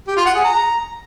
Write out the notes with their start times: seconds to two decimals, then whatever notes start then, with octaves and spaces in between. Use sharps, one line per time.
0.07 G4
0.16 F4
0.26 F#5
0.35 G#4
0.44 A#5